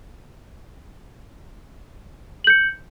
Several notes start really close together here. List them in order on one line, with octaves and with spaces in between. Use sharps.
F#7 G6 C#7